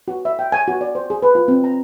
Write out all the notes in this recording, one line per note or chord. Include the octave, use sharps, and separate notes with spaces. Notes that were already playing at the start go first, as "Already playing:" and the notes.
F#4
E5
G5
G#5
F#4
D5
C5
G#4
B4
F4
C4
A#5